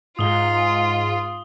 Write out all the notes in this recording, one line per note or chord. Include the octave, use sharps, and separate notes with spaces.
G#2 F4 D#6 G7